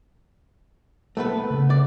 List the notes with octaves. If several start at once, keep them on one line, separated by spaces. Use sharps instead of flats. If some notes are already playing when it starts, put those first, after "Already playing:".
A3 B3 B4
C#3
D5